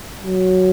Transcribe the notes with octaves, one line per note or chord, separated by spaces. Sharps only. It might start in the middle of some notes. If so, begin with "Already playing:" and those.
F#3